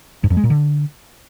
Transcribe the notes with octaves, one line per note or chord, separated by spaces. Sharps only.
G2
F2
G#3
A#2
D3